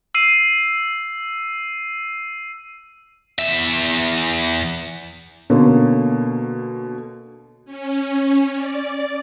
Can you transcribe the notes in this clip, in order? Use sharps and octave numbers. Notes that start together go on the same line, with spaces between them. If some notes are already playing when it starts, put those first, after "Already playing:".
E6 C7 D#7
E2 E5
B2 D3 A#3 C#4
C#4
D5